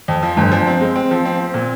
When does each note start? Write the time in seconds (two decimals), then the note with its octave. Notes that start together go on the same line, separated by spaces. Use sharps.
0.08 F2
0.23 F3
0.37 G1
0.52 F3
0.67 C4
0.81 G#3
0.96 C4
1.11 F3
1.25 C4
1.40 C4
1.54 A#2